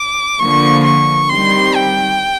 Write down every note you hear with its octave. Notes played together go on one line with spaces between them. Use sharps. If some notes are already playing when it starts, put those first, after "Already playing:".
Already playing: D6
D3 F3 A#3 C#6
C#6
D#3 G3 C4 C6
G5